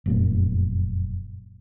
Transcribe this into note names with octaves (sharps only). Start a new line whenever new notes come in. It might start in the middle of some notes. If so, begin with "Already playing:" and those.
F1 F#2 A#2